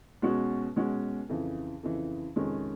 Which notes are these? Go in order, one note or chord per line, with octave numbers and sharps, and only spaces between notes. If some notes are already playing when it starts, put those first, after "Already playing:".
B2 G#3 C#4 F#4
B2 G#3 C#4 F#4
F2 C#3 E3
F2 C#3 E3
F2 C3 D#3 G#3 C#4